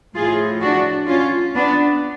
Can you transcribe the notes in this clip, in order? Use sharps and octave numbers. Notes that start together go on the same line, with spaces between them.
A2 F3 F4 G#4
D4 F#4
C#4 F4
B3 D4